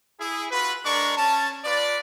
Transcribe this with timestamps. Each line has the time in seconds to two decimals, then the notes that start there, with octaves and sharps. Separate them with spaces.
0.20 E4 G#4
0.51 F4 F#4 B4
0.84 G#3 D4 A#4 D5 C#6
1.17 C#4 A5
1.65 F4 B4 D5